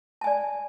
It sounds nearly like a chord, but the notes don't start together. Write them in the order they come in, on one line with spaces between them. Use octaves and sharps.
A5 G#5 D5